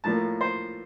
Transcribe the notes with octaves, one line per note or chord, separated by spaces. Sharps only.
A2 F3 A#3 A5
C5